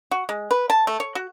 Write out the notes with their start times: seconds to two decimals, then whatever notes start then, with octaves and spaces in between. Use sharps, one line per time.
0.11 F#4
0.29 G#3
0.51 B4
0.70 A5
0.87 A3
1.00 C#5
1.15 F#4